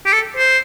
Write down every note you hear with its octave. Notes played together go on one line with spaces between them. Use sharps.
G4
A4
C5